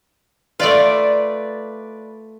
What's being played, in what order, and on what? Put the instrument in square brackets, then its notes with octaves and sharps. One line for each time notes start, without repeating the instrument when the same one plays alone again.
[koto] A3 F4 [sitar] B4 D5